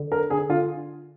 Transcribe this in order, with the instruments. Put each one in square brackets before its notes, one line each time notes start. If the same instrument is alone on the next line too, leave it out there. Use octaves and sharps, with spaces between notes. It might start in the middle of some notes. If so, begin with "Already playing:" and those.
Already playing: [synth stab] D3
[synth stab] D3 [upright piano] A#4
[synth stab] D3 [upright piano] G#4
[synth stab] D3 [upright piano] F4